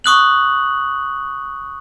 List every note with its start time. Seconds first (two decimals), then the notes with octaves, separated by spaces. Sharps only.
0.04 C#6 D#6 F#6 F#7